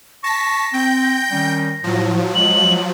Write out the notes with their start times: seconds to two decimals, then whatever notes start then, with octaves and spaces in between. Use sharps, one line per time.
0.24 A5 C#6 A#6 B6
0.74 C4 G5 G6
1.31 D#3 G3 C#4
1.84 A2 F3 F#3
2.35 G#3 F#7